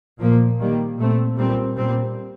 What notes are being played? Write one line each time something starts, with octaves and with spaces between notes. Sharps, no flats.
A#2 F3 A#3
D#3 G3 A#3
A#2 A3 C4
A#2 G3 C4
A#2 G3 C4